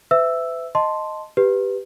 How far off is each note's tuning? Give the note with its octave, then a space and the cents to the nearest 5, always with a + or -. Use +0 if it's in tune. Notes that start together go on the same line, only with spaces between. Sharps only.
B4 +45 E5 +0 E6 +0
D#5 +0 A5 +0 C6 +0
G4 +5 B4 +0